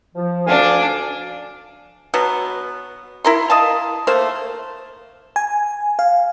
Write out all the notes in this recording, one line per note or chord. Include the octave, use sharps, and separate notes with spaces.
F3
D2 D4 F5 G#5
B2 F#3 B3
E4 A#4 C6
D#5 F5 A5
A3 A#3 C5
G#5
F5